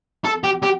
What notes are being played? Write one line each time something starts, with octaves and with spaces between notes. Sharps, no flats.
A4
G4
G4